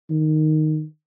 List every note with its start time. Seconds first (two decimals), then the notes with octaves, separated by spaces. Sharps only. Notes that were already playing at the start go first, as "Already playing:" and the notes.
0.10 D#3